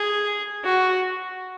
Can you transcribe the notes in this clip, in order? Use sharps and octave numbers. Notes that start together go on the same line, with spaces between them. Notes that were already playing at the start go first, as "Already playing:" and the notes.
Already playing: G#4
F#4